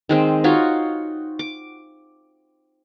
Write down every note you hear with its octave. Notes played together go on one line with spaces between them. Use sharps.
D#3 G#3 C4
D#4 F4 F#4 C#5
D6